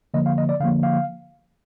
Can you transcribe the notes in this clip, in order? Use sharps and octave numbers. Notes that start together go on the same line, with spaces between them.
D3 F3 A#3 D#5
F5
D#5
D5
D3 F3 A#3 F5
F5